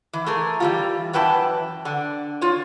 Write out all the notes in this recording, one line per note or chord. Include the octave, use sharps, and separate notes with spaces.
E3
A3 G#4 A#4
E3 G3 F4
F#2 E3 B4 G5 A5
D3
F4 C#5